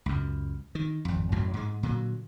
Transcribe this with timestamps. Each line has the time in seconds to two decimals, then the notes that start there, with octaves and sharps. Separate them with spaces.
0.06 C#2 F#2
0.75 D#3
1.05 G#1 F2
1.32 A1 F#2 A2 F#3
1.54 G#2 G#3
1.83 A#2 D3 F#3